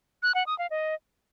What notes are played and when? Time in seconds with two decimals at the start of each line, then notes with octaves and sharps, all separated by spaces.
0.23 F#6
0.35 F#5
0.47 D#6
0.59 F5
0.71 D#5